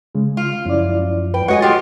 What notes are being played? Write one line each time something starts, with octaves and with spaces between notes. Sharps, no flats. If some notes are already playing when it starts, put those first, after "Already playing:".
C#3 G#3
F4
F#2 F3 C#4 E4 D5
B4 G5
G#3 A3 F#4 C#5 D#5 F#5 G#5
F4 G4 G#4